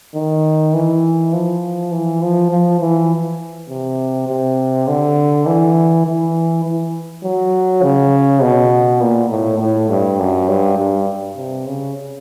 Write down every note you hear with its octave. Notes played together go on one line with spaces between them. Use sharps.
D#3
E3
F3
E3
F3
F3
E3
C3
C3
D3
E3
E3
E3
F#3
C#3
B2
A#2
A2
A2
G2
F#2
G2
G2
C3
C#3